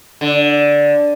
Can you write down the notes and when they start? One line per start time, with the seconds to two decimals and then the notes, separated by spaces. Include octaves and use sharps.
0.21 D3